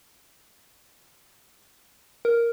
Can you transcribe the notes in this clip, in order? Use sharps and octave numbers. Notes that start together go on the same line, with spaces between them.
A#4